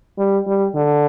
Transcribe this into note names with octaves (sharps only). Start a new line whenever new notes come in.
G3
G3
D3